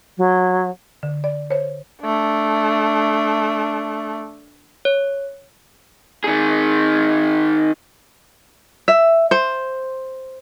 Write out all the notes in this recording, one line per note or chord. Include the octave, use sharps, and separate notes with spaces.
F#3
D3
D5
C5 C#5
A3 D4
C#5
D#3 G#4
E5
C5